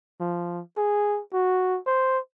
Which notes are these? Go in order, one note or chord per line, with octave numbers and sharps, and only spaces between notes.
F3
G#4
F#4
C5